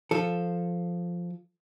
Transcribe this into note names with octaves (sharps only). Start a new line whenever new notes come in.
F3 A4